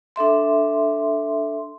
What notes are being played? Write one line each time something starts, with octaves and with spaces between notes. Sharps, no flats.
D4 A4 E5 C6